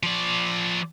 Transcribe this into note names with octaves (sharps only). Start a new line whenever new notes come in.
F3 D5